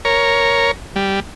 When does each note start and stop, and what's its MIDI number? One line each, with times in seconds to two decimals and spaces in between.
0.05 0.71 70
0.05 0.71 73
0.96 1.20 55